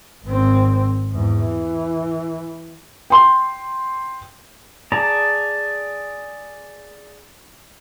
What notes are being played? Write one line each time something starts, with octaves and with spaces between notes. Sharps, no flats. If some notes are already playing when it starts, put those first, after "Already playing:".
G#1 C4
E2 G#2
E3
G5 C6
G#4 D5 A5 A#5